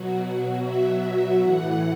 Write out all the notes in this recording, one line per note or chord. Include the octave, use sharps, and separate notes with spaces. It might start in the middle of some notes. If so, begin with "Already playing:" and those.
Already playing: B2 F#3 F#4
E5
A2 E3 F#5